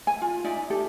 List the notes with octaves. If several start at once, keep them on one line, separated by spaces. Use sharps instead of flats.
G#5
F4
D#4 D5 E5
G4 A4